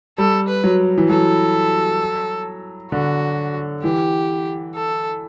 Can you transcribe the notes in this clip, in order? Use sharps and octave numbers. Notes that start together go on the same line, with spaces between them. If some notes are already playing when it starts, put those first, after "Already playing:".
G3 A4
B4
F#3
E3
F#3 A4
D3 F#4
E3 G4
A4